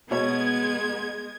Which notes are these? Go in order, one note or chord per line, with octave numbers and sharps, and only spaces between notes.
B2 G#3 B3 C#5 G#6